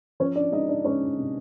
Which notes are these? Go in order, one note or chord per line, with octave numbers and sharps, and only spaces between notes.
F3 C#4 C#5
D4 D5
G#3 D#4 D#5
D4 D5
G#3 C#4 C#5
C3